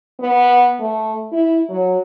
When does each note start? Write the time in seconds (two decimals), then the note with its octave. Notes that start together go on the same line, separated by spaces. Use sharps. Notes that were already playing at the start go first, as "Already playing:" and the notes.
0.20 B3
0.80 A3
1.32 E4
1.69 F#3